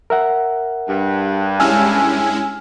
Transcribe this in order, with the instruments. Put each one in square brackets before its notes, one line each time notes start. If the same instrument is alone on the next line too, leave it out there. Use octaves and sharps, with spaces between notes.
[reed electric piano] A#4 E5 F#5
[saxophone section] G2
[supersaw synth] G#3 C#4 E4 [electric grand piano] G#5 E6 F6